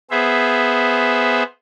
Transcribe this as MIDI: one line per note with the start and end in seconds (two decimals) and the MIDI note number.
0.11 1.43 59
0.11 1.43 68
0.11 1.43 72
0.11 1.43 76